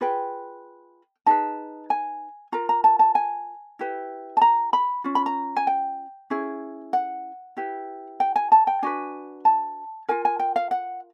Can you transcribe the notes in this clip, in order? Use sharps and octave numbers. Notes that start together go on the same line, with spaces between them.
F4 G#4 B4 G5
D#4 G#4 B4 A5
G#5
F4 A#4 A#5
A#5
A5
A5
G#5
E4 G4 B4
A5
A#5
B5
C#4 F4
B5
A#5
G#5
G5
C#4 E4 G#4
F#5
E4 G4 B4
G5
G#5
A5
G5
D4 F#4 B4 G#5
A5
F4 A#4 G#5
G#5
G5
F5
F#5